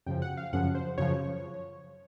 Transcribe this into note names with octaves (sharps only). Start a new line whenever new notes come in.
F#2 C#3 F3 G5
F#5
F5
F#2 C#3 F3 F#5
C5
F#2 C#3 F3 C#5